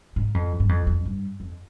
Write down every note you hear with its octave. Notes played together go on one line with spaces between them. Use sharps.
G#2
F2
G2
F2
F2
G2
F2